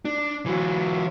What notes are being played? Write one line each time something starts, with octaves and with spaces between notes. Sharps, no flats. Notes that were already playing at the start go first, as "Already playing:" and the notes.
D4
E3 F#3